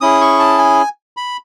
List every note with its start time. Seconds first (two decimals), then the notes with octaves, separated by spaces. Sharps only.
0.01 C#4 E4 G#4 D#6
0.21 C#6
0.39 A5
0.58 G#5
1.17 B5